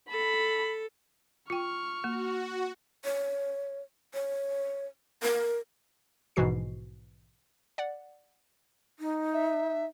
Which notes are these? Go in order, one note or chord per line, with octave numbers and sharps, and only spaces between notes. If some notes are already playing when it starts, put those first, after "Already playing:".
A4 B5
F4 G5 C#6 F6
A#3 F#4
C#5
C#5
A#4
A#1 G#2 B2 E3 F#4 C7
D5 F#5
D#4
E5